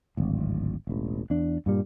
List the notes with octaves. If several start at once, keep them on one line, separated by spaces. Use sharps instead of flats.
D1 G#1
E1 A1
E2 D4
G2 A#2 G3